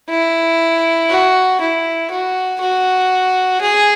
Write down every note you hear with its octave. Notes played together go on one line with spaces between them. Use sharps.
E4
F#4
E4
F#4
F#4
G#4